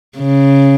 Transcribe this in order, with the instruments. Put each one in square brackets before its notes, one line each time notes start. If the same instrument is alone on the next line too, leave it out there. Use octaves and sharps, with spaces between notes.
[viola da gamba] C#3